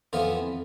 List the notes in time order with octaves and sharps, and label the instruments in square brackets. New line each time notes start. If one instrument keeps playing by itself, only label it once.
[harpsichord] F2 E3 B3 F4